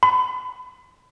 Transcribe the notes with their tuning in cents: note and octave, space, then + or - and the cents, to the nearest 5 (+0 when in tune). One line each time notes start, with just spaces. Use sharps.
B5 +35